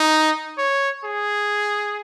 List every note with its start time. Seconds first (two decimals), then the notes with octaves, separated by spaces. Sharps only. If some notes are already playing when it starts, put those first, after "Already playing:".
Already playing: D#4
0.58 C#5
1.05 G#4